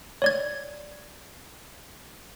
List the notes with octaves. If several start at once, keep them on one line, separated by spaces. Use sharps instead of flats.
C#5 D5 G#6